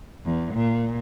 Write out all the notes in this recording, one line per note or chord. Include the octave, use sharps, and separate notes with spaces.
E2
A#2